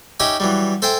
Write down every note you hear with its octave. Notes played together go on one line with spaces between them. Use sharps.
C#4 D#4 G4 E5 G#5
E3 F#3 G3
A4 C5 E5 G5 G#5